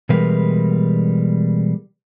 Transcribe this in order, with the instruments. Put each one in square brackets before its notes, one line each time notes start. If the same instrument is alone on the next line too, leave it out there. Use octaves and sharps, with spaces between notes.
[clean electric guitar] B2 E3 G3 G#3 A#4 B4